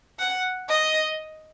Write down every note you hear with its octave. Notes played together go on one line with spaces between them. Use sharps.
F#5
D#5